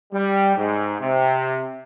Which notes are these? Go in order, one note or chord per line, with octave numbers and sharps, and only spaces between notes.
G3
G#2
C3